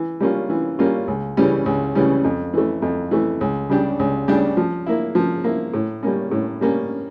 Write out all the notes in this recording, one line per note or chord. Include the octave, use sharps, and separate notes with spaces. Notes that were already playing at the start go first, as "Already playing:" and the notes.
Already playing: E3
G3 A#3 C#4 F4
E3
G3 A#3 C#4 F4
C#2
C#3 E3 G3 C#4
C#2
C#3 E3 G3 C#4
F2
E3 A3
F2
E3 A3
C#2
C#3 G3 D4 G4
C#2
C#3 G3 D4 G4
F3
A#3 E4
F3
A#3 E4
A2
G3 A#3 C#4
A2
G3 A#3 C#4